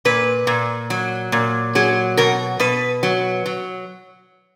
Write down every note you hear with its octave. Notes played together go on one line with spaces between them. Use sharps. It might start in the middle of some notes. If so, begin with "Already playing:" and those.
A#2 B4
A#2
F#3
A#2
F#3 G#4
B2 A#4
B2 B4
F#3
F#3